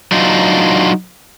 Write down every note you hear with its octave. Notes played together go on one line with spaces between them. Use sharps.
F#3 D4 D#4 F4